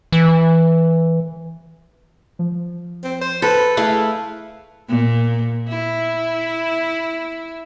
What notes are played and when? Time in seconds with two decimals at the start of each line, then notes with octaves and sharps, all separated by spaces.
0.12 E3
2.39 F3
3.03 C4
3.21 C5
3.42 A4 B4
3.77 A3 E4 G#4 B4 E5 F5
4.89 A#2
5.69 E4